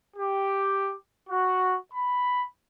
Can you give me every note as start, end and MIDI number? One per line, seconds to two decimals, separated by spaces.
0.16 0.93 67
1.29 1.76 66
1.94 2.43 83